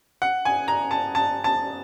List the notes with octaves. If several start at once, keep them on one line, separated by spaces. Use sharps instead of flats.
F#5
G#5
A#5
A5
A5
A5